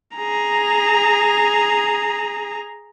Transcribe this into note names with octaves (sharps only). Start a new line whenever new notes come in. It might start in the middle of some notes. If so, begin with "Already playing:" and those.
G#4 A#5